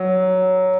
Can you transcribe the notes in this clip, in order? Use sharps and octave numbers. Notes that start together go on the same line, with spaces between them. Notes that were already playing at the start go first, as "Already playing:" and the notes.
Already playing: F#3